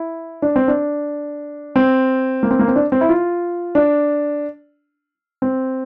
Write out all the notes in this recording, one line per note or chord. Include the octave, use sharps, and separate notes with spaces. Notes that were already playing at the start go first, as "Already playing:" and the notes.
Already playing: E4
D4
C4
D4
C4
A#3
C4
A#3
C4
D4
C4
E4
F4
D4
C4